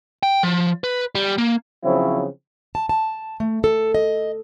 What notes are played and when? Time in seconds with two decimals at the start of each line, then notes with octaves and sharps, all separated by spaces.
0.23 G5
0.43 F3
0.84 B4
1.15 G3
1.38 A#3
1.84 C#3 F3 F#3 C4 E4
2.75 A5
2.89 A5
3.40 A3
3.64 A4
3.95 D#5